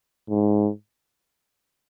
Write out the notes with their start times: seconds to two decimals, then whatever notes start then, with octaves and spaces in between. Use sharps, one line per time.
0.30 G#2